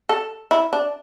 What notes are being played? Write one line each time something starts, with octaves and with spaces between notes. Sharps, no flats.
A4
E4
D4